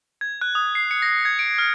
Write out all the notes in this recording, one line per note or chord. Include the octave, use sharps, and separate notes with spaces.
G#6
F#6
D#6
C7
C#7
A#6
G#6
D7
F6